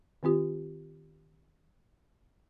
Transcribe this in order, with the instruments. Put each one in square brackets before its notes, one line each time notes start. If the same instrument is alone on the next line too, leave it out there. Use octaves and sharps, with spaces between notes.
[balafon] D#3 C4 F4 G4